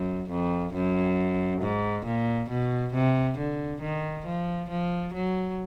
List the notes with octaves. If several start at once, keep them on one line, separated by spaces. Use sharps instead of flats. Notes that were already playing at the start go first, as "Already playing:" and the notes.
Already playing: F#2
F2
F#2
G#2
A#2
B2
C3
D3
D#3
F3
F3
F#3